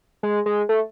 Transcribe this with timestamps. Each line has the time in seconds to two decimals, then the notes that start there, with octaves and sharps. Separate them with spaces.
0.23 G#3
0.46 G#3
0.69 A3